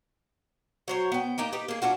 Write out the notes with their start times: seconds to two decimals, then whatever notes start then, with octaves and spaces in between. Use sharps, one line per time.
0.88 F#3 C5 C#5
1.12 B3 G5
1.38 A#3 D#4 G4 A#4
1.53 D#4 G4 B4
1.68 A#3 G#4
1.82 C#4 D4 F4 F#4